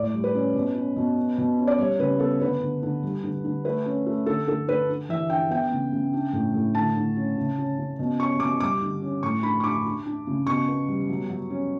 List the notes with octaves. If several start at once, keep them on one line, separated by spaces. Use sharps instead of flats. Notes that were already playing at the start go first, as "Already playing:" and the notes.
Already playing: A2 D5
G3
B4
C#4
B2
C#4
B2
C#4
B2
C#4
D5
G3 C#5
C#3 B4
B3 A4
D3 B4
D3
D3
G3
D3
D3
A3 B4
C#4
A3
D3 A4
D3 A4
D3 B4
D4
E3 E5
D4 G5
B3 G5
C#3
C#3
D4
A2
A2
D3 A5
D3
C#4
C#3
C#4
C#3
B2
C#4 C#6
B2 D6
G3 D6
D3
C#4
A2 C#6
D4 B5
C#6
D4 D6
D4
D4
C#3
B2 C#6
B3
G3
F#3
F#3
C#4